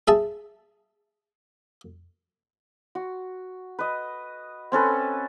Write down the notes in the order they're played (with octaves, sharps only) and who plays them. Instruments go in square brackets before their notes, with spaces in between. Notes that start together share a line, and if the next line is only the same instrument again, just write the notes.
[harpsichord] G#4 E5 A5
[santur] F#4
B4 D#5
C4 C#4 A4 B4